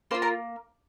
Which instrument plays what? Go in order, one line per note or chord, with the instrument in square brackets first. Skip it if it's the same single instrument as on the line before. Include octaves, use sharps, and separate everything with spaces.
[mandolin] A#3 F4 C5 C6
A#4 A#5